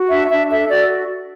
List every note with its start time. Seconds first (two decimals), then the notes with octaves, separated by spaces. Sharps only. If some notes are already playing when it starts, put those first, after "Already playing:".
Already playing: F#4
0.10 D4 E5
0.30 D4 E5
0.50 A4 E5
0.69 F#4 D5